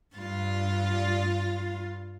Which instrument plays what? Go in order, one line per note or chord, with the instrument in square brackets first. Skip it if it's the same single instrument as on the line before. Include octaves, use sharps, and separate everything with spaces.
[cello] G2 F4